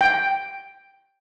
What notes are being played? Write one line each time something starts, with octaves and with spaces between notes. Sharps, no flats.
G5